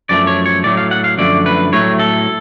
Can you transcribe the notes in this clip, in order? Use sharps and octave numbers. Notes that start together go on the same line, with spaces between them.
F#2 F3 A3 D5
C#5
C#5
A2 F#3 A3 D5
F5
F#5
F5
F#2 D3 F3 A3 D5
B4
A2 F#3 A3 C#5
A4